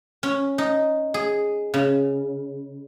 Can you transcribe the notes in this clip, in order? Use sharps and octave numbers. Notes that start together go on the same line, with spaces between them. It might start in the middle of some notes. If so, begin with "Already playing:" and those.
C#4
D#4
G#4
C#3